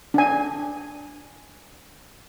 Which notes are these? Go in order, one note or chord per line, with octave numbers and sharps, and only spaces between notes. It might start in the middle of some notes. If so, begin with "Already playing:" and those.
D4 G#5